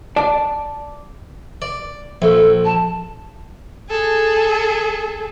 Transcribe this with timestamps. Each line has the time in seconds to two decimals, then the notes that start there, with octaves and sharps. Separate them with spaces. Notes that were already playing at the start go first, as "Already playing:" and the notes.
0.16 D5 A5
1.62 D5
2.22 A#1 A4
2.65 A5
3.90 G#4 A4